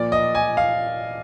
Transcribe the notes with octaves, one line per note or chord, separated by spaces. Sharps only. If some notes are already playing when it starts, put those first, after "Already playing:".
Already playing: A#2 F3 A#3 D5
D#5
G#5
F5